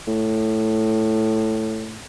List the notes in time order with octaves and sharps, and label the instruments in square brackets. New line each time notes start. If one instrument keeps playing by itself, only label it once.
[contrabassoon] A2